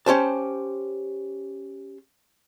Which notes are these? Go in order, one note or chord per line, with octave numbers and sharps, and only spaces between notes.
C#4 G4 C5 A5